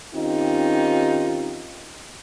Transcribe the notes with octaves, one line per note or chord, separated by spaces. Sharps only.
D#3 C4 C#4 D#4 F4 G4